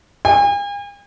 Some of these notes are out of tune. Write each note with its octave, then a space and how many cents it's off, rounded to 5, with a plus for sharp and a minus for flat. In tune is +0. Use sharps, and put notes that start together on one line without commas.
G#5 -45